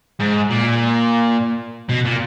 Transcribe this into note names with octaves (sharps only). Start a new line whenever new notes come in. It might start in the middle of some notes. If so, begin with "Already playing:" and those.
G#2
A#2
B2
A#2